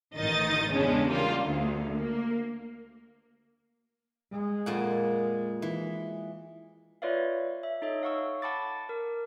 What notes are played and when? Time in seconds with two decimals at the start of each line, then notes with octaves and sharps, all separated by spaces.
0.14 A1 D#3 D#4 D#5 A6
0.72 E2 C#3 G#3 C#4 D4
1.08 G3 A#3 F4
1.42 D2
1.96 A#3
4.33 G#3
4.66 F2 A#2 F#5
5.62 E3
7.02 F4 B4 C#5 D5 E5 F5
7.63 E5
7.82 D#4 A4 C#5 D#5
8.02 C#5 F5 F#5 C#6 E6
8.42 F#5 A5 B5 D6 A6
8.89 A#4